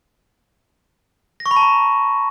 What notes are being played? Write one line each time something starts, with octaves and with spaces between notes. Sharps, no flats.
A#6
C#6
B5
A5
A#5